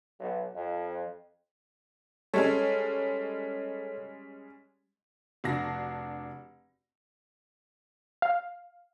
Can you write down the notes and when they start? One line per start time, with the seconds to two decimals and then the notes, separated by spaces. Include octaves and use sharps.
0.19 B1
0.55 F2
2.34 G3 G#3 C#4 A4 C#5
5.44 F1 D4 F#4 A#6
8.22 F5